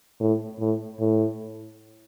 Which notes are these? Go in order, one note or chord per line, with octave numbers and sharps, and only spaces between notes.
A2
A2
A2